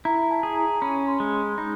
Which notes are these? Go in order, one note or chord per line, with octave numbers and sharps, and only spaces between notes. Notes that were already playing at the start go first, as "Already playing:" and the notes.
E4 A#5
A5
G#4
A#5
C#4 B5
C6
G#3
C6
D#4 B5